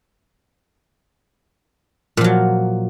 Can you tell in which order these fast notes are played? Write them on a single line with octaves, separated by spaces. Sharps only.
A#2 F3 F#3